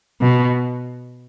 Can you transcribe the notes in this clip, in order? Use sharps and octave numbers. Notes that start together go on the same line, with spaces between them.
B2